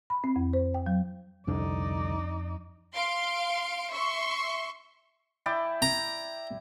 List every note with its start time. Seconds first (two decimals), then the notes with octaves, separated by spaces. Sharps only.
0.10 B5
0.24 C4
0.36 F2
0.53 C5
0.74 G5
0.86 F#3
1.47 C2 F2 D3 D4 D#4 D5
2.94 F5 C6 D7
3.92 E5 C6 C#6
5.46 E4 D5 G5
5.82 A#5